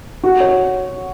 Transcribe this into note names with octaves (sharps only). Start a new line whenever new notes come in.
F#4
C#5